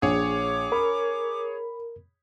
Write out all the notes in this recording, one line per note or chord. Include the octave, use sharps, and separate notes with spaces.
A#1 G#4 C#5 D6
A#4 B5